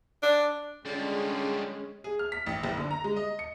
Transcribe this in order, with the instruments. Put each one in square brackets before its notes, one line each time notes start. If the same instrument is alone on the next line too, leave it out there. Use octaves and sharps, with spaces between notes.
[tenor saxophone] D4
[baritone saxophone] D3 [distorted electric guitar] G3 F4 [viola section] G#3 C#4
[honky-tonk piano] G#4
F6
B6
A1
F#1
D3
A#5
G#3
D#5
C#7